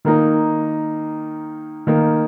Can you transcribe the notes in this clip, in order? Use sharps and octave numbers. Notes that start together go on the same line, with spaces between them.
D#3 A#3 D#4
D#3 A#3 D#4